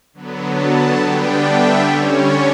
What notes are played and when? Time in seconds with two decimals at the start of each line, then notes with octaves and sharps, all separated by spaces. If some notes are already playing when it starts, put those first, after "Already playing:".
0.13 D3 F#3 B3
0.56 A5
0.99 D3 G3 B3 D4 G5
1.43 E5
1.86 D3 G3 C#4 C#5